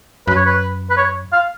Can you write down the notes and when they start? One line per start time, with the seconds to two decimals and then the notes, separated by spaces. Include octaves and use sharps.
0.27 F#2 B4
0.36 C#5
0.46 B4
0.90 B4
0.97 C#5
1.33 F5